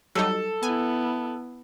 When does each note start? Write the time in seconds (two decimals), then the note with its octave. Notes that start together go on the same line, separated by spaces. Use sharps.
0.15 F#3 G3 D#4 A4
0.63 B3 E4 G#5